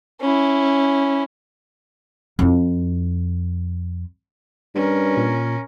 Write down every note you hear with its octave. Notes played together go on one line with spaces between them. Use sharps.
C#4 E4
F2 E4
G2 C#4 A#4
A#2